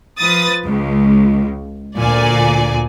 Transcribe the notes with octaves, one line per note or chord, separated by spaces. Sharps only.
F3 B4 D#6 A6
C#2
D2 A#2 D5 G#5